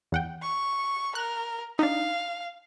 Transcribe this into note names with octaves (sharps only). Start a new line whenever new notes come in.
E2 F#5 G5
C#6
A#4 F#6
D4 D#4 F5